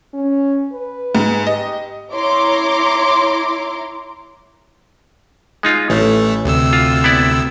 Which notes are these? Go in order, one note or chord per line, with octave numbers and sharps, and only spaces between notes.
C#4
B4
G#2
G4 D#5
E4 C#5 A#5 C6 D6
G#3 D#4 F4
A1 E3 A3
D2 C3 E6
F4
B3 E4 D5